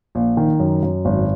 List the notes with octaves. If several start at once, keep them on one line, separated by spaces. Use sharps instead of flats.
A#1
D#3
F#2
F#2
G#1